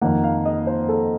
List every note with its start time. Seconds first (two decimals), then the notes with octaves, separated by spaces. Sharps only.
0.01 F2 D#3 A#3 F#5
0.24 F5
0.45 D#5
0.67 C5
0.89 A4